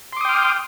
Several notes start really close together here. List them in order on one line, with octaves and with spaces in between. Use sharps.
C6 D6 D#6 G5 F6